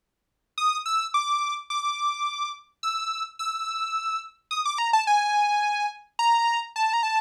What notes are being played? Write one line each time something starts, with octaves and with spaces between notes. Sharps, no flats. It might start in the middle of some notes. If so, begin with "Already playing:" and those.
D#6
E6
D6
D6
E6
E6
D#6
D6
A#5
A5
G#5
A#5
A5
A#5
A5